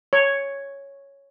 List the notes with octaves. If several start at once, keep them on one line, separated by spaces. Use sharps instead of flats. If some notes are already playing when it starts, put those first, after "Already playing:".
C#5